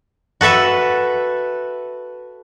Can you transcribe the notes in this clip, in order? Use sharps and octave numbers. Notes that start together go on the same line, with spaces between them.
F#4 A4 B4 E5